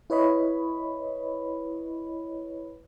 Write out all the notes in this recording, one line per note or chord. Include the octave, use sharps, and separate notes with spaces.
E4 B4 C#5 D#5 B5